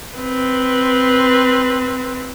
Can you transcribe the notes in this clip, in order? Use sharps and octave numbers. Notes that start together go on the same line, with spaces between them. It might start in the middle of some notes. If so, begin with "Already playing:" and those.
C4 B4